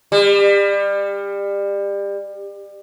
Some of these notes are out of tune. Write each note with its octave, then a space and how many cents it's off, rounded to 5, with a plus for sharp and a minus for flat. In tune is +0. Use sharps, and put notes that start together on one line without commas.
G3 +30